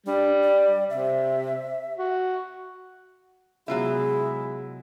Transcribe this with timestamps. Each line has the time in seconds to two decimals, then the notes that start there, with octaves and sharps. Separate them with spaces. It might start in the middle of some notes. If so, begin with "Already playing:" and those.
0.06 G3 D4
0.43 D5
0.90 C3 E5
1.98 F#4
3.68 C3 F#3 G#3 B3 E4 F4 G#4 E5